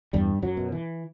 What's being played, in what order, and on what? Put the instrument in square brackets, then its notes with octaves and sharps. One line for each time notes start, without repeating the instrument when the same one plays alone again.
[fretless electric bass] E2 G2 G3
F#2 F#3
B2
E3